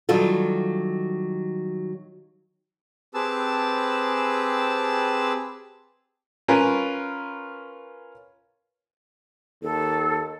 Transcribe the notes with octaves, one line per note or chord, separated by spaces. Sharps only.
D#3 F#3 G3 F4 A4
C4 G4 G#4 B4 A5 E6
C#4 F4 A#4 B4 G#5
D#2 A4